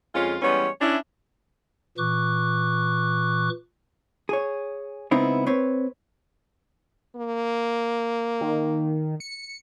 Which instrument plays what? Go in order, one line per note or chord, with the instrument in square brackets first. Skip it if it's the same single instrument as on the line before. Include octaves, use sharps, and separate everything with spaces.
[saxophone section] F2 G#3 C#4 F4
E3 G3 G#3 B3 C#4 C#5
C#4 D4 E4
[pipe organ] A#2 E3 C#6 D6 F#6
[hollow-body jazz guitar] G#4 C#5
C#2 B3 C4 D#4 E4
C4 B4 C#5
[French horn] A#3
[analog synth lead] D#3
C#7